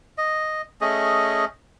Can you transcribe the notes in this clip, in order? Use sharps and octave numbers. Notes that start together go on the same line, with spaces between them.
D#5
A3 C#4 G#4 D#5